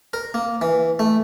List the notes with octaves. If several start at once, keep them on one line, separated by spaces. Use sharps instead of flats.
A#4
A#3
E3
A3